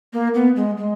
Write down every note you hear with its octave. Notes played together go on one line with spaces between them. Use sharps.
A#3
B3
G#3
G#3